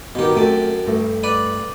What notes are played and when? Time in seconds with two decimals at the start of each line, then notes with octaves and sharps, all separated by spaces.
0.15 G2 B2 D#3 G4
0.35 F#2 A3 C4 G4 G5 A5
0.86 G2 A3
1.23 B4 D5